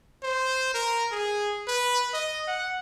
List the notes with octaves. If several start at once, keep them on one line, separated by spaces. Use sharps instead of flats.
C5
A#4
G#4
B4
D#5
F#5